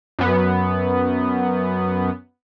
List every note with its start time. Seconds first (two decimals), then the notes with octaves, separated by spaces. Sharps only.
0.19 F#2 B3